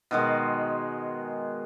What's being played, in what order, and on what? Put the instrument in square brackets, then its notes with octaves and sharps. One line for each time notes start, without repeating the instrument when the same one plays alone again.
[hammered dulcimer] B2 D#3 G#3